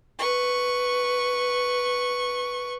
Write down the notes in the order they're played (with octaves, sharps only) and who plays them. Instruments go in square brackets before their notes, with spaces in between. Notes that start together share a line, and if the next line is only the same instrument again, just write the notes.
[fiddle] B4 C#6